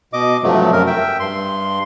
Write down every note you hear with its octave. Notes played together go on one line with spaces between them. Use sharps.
B2 D#5 D6
G2 C3 F3 F#3 A3
F#2 A#4
E5 G5
G2 C6